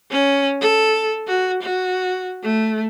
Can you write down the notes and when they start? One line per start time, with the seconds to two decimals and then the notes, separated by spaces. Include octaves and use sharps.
0.11 C#4
0.61 A4
1.27 F#4
1.62 F#4
2.43 A3